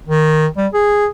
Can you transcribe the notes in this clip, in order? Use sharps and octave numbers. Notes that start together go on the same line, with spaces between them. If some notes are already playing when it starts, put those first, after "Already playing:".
D#3
G3
G#4